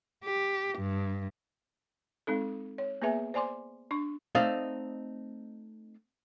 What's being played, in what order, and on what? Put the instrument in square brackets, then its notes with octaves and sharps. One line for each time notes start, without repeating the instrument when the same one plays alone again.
[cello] G4
G2
[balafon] G#3 C4 D#4 A4
C#5
A#3 B3 G#4 B4 E5 G#5
C5 D5 G#5 C6 D6
D4 C#6
[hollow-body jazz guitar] A3 C4 D#4 D5 D#5 F5